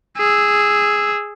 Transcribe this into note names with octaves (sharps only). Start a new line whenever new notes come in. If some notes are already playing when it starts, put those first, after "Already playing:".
G#4 E6